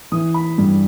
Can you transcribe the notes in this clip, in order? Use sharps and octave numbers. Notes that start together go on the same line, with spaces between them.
E3 D#6
B5
G2